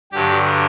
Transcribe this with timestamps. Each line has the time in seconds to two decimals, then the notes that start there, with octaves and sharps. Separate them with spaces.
0.12 G2 D3 F#3 G4